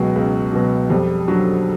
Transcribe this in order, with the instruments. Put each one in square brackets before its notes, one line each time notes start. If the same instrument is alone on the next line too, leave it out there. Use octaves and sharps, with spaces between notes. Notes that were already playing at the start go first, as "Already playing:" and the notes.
Already playing: [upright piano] C#2 B2 F#3 G#3
C#2
B2 F#3
F2 G3
D3 F#3